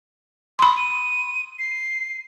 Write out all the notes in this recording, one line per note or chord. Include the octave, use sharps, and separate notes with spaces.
B5 C6 D#6
D#7
C7